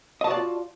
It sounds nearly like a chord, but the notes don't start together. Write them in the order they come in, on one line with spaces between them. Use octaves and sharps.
D#5 A5 F#4 D5 F4